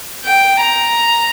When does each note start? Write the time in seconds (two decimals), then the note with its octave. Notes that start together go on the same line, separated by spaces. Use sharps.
0.25 G5
0.61 A#5